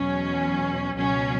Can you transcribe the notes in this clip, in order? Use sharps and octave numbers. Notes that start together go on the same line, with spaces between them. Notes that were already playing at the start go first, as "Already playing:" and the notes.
Already playing: E2 B2 F#3 C#4
C#2 B2 F#3 C#4